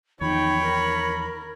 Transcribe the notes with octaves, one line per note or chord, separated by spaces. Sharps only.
E2 D#3 F3 D#4 C#5 G5 B5
A#4